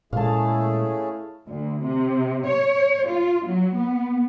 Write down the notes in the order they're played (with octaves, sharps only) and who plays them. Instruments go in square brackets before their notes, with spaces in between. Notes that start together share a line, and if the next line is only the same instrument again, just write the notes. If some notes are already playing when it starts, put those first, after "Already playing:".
[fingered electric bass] A#2 G#3 [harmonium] A3 C#4 G#4 [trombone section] E4 [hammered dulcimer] F5 A5
[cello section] D2
C3
C#5
F4
F#3
B3